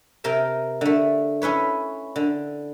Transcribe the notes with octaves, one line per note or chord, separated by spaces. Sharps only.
C3 A#4 G5 A5
D3 A3
C#4 E4 B4 C#5
D3